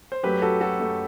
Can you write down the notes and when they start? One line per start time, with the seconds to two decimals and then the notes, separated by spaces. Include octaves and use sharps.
0.12 C5
0.23 F#2 F#3 A3 G4 B4
0.42 F#4 A4
0.61 F#4 A4
0.80 F#2 F#3 A3